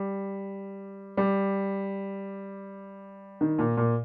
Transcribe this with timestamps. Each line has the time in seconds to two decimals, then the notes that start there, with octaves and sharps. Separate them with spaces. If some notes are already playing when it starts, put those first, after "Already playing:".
Already playing: G3
1.17 G3
3.41 D#3
3.59 A#2
3.77 A#2